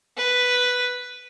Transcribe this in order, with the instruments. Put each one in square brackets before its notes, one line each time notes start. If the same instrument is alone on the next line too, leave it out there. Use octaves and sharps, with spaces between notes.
[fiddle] B4